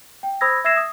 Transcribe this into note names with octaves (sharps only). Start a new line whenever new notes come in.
G5
C5 B5 D#6 E6 G#6 A#6
E5 E6 G#6 A#6 C7 E7
D#6